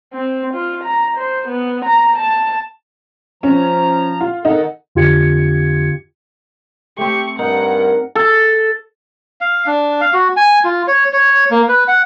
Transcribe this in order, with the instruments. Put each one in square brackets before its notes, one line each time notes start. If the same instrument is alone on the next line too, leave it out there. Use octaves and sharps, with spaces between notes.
[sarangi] C4
F4
A#5
C5
B3
A#5
A5
[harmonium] F3 A#5 [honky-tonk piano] C#4
[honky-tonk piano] F4
[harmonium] D#3 A4 F#5 [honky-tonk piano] D#4
[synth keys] F2 D3 F4 G4 G#6 C#7
[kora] A3 C4 [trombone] G4 [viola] C#6
[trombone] G2 [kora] D#4 [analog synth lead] A#4 [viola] F#5
[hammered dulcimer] A4
[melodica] F5
D4
F5
F#4
G#5
F4
C#5
C#5
A#3
B4
F#5